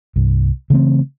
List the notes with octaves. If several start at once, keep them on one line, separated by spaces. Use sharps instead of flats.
C2 G2
C#3 E3 A3 C4